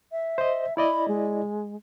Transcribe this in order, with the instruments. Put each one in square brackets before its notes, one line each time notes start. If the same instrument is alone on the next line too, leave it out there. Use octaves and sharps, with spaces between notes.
[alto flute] E5
[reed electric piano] C5 D#5
[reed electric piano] E4 D5 D#5 [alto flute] B5
[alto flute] G#3